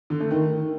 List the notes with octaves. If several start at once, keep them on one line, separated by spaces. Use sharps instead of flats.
D3
A3
D#3